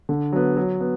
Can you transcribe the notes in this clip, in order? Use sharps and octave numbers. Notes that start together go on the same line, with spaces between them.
D3
F#3 B3
F#3
B3